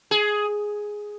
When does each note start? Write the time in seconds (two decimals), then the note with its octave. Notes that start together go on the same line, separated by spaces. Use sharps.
0.11 G#4